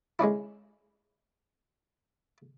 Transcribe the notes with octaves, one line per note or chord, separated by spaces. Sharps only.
G#3 C#4 D4 E4